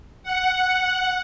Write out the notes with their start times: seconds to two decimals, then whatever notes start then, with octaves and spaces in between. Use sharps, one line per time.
0.23 F#5